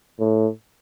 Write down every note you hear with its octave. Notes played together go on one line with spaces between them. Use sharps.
A2